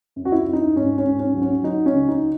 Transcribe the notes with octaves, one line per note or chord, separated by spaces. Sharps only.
F#2
F#4
E4
F#2
D#4
G#2 C#4
C#4
G#2
C#4
F#3
C#4
F#3 D#4
C#4
C#2
D#4